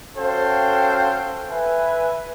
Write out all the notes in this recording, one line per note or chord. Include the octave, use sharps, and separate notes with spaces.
C#4 F#4 A4 C5 F5 G5
B4 E5 G#5